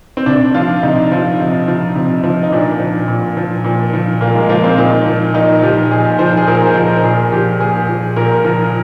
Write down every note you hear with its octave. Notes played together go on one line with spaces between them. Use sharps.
C4
C3 D4
F3 F4
C3 D#4
F3 F4
C3
F3
C3
F3
D#4
A#2 D4
F3
A#2
F3
A#2
F3
A#2 A#3
G#3
F3 A#3
C4
A#2 D#4
F3
A#2 D#4
F3 G4
A#2 G#4
F3 C5
G#4
A#2 A#4
C5
F3
A#4
A#2 G#4
F3 G4
A#2 G#4
F3
A#2 A#4
F3 A#4